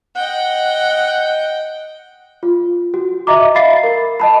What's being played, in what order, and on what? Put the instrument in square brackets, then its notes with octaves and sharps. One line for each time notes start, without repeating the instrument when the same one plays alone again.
[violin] D#5 G5 [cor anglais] F#5
[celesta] F4
F#4
D#5 E5 A#5 D6
E5 F5 B5 A6 C7
A#4
D#5 A5 B5